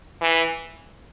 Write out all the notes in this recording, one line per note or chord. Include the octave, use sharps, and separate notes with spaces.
E3